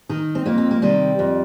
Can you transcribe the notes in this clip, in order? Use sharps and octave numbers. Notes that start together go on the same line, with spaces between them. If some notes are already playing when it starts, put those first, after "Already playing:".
D#3 D#4
C4
F2 A#3
C4
A#3
C3 D#3 G3
F2